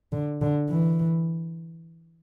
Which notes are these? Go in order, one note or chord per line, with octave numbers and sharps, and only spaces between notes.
D3
D3
E3